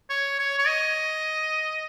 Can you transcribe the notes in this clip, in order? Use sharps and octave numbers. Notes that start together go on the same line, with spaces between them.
C#5
C#5
C#5
D#5